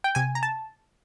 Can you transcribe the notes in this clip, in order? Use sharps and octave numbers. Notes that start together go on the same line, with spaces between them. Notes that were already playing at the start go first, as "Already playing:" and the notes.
G5
C3 G#5
A#5
A5